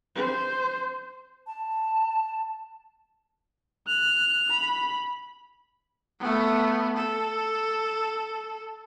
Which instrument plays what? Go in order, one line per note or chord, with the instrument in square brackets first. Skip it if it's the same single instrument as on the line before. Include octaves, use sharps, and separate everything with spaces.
[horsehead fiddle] C5
[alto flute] A5
[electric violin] F#6 [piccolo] F7
[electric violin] B5
A3 B3
A4